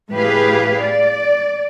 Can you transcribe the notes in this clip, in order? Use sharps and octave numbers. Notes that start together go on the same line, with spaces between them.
A2 G4 G#4 B4 F5
D5